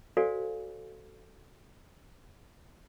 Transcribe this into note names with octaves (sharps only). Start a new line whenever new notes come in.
F#4 A4 C5 D5 F5 G#5